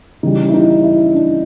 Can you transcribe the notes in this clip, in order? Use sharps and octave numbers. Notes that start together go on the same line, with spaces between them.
C#3 E3 G3 D#4
E4
D#4
E4
D4